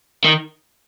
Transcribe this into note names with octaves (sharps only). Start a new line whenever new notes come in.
D#3